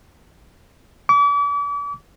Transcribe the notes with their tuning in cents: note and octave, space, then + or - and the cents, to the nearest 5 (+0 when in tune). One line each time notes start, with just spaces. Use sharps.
D6 -40